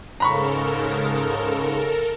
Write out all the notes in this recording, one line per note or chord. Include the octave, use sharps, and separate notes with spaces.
G#2 C#3 A4 A#4 A#5 B5 C#6